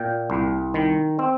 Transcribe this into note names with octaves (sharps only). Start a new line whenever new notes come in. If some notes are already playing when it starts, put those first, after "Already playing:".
Already playing: A#2 G5
C2
D#3
C4